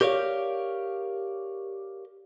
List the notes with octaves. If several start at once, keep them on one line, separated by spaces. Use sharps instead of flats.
G4 A#4 C#5 D5 F5